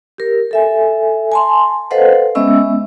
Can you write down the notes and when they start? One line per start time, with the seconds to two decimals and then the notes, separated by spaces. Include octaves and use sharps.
0.18 G4 A#4
0.51 A4 E5 G#5
1.32 G#5 A5 C6
1.91 A4 B4 C5 D#5 F5 F#5
2.35 G#3 B3 C#4 D#5 E5 E6